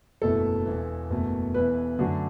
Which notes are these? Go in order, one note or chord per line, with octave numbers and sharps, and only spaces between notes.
F#1 E2 B2 A3 E4 A4
E1 E2 E3
F#1 E2 B2 A3
E1 E2 E3 B4
F#2 D3 F#3 A3 D4 F#4